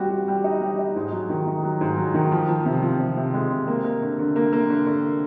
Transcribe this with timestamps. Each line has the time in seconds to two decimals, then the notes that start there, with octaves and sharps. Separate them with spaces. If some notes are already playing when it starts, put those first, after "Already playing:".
Already playing: G3 C4 F#4
0.10 F#4
0.28 G3
0.44 D#4
0.61 G3
0.79 D#4
0.96 G#2
1.12 F#3
1.29 D#3
1.47 D#3
1.63 F#3
1.81 G#2
1.97 F#3
2.14 D#3
2.32 F3
2.49 F3
2.66 C3
2.83 F3
2.99 C3
3.17 C3
3.34 G#3
3.51 C3
3.68 A#3
3.84 A#3
4.02 D3
4.19 D3
4.36 A#3
4.53 A#3
4.70 D3
4.86 D3